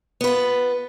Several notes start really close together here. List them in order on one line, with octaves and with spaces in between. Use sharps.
B3 B4 F4